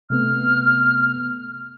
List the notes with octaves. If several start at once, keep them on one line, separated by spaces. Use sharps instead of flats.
C3 A3 B3 F6